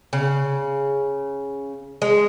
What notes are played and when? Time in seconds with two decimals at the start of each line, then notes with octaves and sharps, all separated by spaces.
0.13 C#3
2.02 G#3